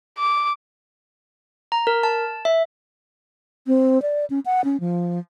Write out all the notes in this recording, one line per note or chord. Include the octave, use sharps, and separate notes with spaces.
D6
A#5
A#4
A5
E5
C4
D5
C#4
F#5
C#4
F3